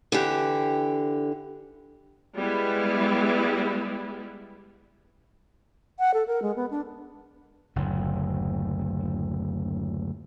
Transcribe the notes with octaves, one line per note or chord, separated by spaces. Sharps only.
D3 E3 G4
G3 G#3 B3 E4
F#5
A4
A#4
G#3
B3
D4
F#1 D2 A2